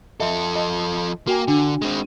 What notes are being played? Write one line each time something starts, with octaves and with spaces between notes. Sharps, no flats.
F3 A4 D#5 E5
D#5
A#3 F#4 G5 G#5
D3 D4
G#3 C4